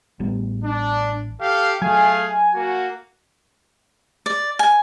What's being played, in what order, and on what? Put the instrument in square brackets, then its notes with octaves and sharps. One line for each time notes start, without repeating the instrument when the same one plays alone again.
[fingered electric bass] A1 G3 B3
[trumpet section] D4
G4 A4 F5
[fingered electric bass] F#3 [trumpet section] A3 G#4 F5 [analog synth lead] G#5
[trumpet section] A#3 F#4
[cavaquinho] D5
G#5